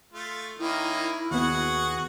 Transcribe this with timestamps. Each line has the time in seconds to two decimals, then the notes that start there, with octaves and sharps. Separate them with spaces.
0.13 A3 F4
0.59 D#3 A#3 C#4 E4
1.31 D#2 B3 F#4 G#4 F#5